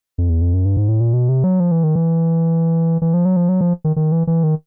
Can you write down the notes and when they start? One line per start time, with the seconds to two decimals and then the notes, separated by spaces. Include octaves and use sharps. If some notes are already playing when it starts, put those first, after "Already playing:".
0.18 F2
0.29 E2
0.42 F2
0.54 F#2
0.65 G2
0.77 G#2
0.88 A2
1.00 A#2
1.13 B2
1.29 C3
1.44 F#3
1.60 F3
1.71 E3
1.84 D#3
1.95 E3
3.02 E3
3.14 F3
3.25 F#3
3.36 F3
3.49 F#3
3.61 F3
3.84 D#3
3.96 D#3
4.12 E3
4.27 E3
4.43 D#3